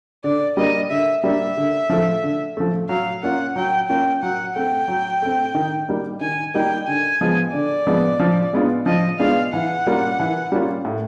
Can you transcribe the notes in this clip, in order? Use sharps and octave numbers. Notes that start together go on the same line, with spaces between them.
D3 D5
G3 A#3 D4 D#5
D3 E5
G3 A#3 D4 E5
D3
F3 A3
D3
F3 A3
F#3 F5
A#3 C#4 F4 F#5
F#3 G5
A#3 C#4 F4 G5
F#3 F#5
A3 C4 G5
F#3
A3 C4
D#3
G3 A#3 D#4
D#3 G#5
G3 A#3 D#4 G5
D3 G#5
F3 G#3 B3
D3 D5
F3 G#3 B3
F3
G#3 B3 D4 F4
F3 D#5
G#3 B3 D4 F4 F5
E3 F#5
G3 A#3 C#4 F4
E3
G3 A#3 C#4 F4
A2